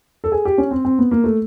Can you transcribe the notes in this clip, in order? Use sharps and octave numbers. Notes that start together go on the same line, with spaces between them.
A4
G#4
G4
C#4
C4
C4
B3
A#3
A3